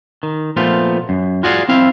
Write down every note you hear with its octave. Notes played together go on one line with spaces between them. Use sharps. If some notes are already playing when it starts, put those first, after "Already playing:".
D#3
A#2 F3 A3 B3 F4
F#2
F4 F#4 G#4 D5 E5 F5
C4 E4 F5